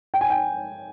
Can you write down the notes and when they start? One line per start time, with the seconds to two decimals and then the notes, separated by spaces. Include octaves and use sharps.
0.14 G5
0.21 G#5
0.30 G5